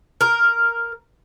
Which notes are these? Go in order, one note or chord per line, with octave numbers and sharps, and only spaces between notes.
A#4